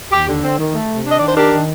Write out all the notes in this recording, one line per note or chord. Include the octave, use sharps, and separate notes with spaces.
D#2 G4
D3
C4
D#3
A3
C3
D4 D#5
D#3 D5
C5
D4 G4 A#4
D#3